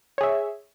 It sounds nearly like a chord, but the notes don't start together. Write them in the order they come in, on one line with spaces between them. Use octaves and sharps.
C#5 G#4 E5